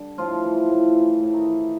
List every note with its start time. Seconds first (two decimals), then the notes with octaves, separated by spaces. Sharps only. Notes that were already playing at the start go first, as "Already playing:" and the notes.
Already playing: D3 G3
0.18 A2 F3 F4
0.43 E3
0.69 A2
0.95 E3
1.21 A2
1.33 D#3 D#4
1.47 E3